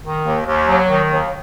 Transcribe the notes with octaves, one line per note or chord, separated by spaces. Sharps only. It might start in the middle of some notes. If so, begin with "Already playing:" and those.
D#3
D#2
D#2
F#3
D#3
D#2